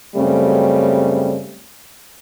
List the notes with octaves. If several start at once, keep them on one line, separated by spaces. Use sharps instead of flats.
F#2 C#3 G3 A3 C4